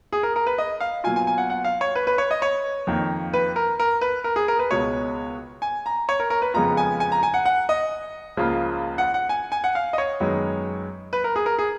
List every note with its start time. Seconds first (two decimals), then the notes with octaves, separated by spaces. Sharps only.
0.12 G#4
0.23 A#4
0.36 A#4
0.47 B4
0.58 D#5
0.80 F5
1.04 B2 F#3 A#3 F4 G#5
1.16 G#5
1.27 G#5
1.38 F#5
1.50 F#5
1.64 F5
1.81 C#5
1.95 B4
2.07 B4
2.18 C#5
2.31 D#5
2.42 C#5
2.87 F2 D#3 A#3
3.34 B4
3.56 A#4
3.80 A#4
4.01 B4
4.24 A#4
4.36 G#4
4.48 A#4
4.59 B4
4.71 C#2 B2 G#3 C#5
5.62 G#5
5.86 A#5
6.09 C#5
6.20 A#4
6.30 A#4
6.42 B4
6.54 F2 C#3 G#3 B3 F4 A#5
6.77 G#5
7.00 G#5
7.12 A#5
7.23 G#5
7.34 F#5
7.46 F#5
7.69 D#5
8.37 C#2 C#3 F3 A#3 F4
8.98 F#5
9.14 F#5
9.29 G#5
9.52 G#5
9.64 F#5
9.75 F5
9.93 D#5
9.98 C#5
10.20 F#2 D#3 G#3 B3
11.13 B4
11.24 A#4
11.36 G#4
11.46 A#4
11.58 G#4